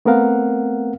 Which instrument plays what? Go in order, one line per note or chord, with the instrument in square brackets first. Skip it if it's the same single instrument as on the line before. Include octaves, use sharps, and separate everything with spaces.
[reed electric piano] A3 B3 C4 A#4 F5 F#5